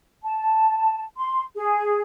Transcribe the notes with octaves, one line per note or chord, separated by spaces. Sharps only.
A5
C6
G#4